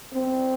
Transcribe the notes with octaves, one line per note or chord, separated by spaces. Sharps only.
C4